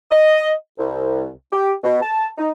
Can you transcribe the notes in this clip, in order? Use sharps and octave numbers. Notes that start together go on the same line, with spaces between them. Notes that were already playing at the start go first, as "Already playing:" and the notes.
D#5
C2
G4
B2
A5
D#4